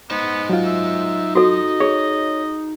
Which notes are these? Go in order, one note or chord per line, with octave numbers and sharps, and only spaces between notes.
B3 D#4 C5
F#3 F4
E5
F#4 A4 D#5
G#4 C#5